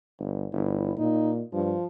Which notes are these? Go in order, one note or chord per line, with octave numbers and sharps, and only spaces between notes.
G1
G1 E4
A#2 D#4
G2 F3